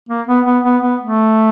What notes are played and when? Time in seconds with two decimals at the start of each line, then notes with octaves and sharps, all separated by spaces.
0.09 A#3
0.28 B3
0.46 B3
0.64 B3
0.83 B3
1.01 A3